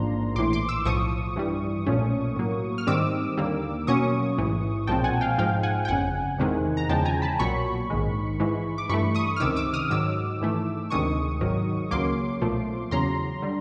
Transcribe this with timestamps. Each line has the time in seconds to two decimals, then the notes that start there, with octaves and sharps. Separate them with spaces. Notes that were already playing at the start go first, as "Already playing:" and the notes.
Already playing: A1 G#2 F3 A#3 D4 A#5 C6
0.35 A#1 A2 E3 C6 D6
0.53 C6 D6
0.69 D6 E6
0.85 B1 A2 F3 C#6 D#6
1.36 G2 E3 G3
1.86 B1 A#2 F3 A3 C#4
2.36 A2 F#3 A#3
2.78 F6
2.87 G#2 D#3 G3 C4 D6 E6
3.37 D#2 D3 G3 A#3
3.87 B2 F#3 A#3 C#4 C#6 D#6
4.38 A1 G#2 E3
4.87 B1 A#2 F3 G#3 C4 G5 A5
5.04 F#5 G#5
5.21 F5 G5
5.38 G#2 F3 G#3 F5 G5
5.63 F#5 G#5
5.85 G5
5.88 G1 F2 C#3 F#5 G#5
6.38 E2 C3 D#3 G#3
6.77 A#5
6.89 E2 C#3 F3 G#3 G5 A5
7.05 G#5 A#5
7.22 A5 B5
7.39 B1 A#2 F#3 B5 C#6
7.90 A#1 G#2 D#3 G#3
8.40 G#2 E3 G#3
8.78 D6
8.89 G2 E3 A3 B5 C#6
9.15 C#6 D#6
9.36 F6
9.40 C#2 C3 D#3 D6 E6
9.56 D6 E6
9.73 D#6 F6
9.90 G#2 D#3 F#3 D6 E6
10.41 G#2 E3 A3
10.90 D2 C3 D#3 G#3 C#6 D#6
11.41 G#1 G#2 D#3 F#3
11.91 C#2 C#3 F#3 A#3 C6 D6
12.42 B1 A#2 F3 A3
12.91 E2 C#3 F#3 A#5 C6
13.42 D3 G3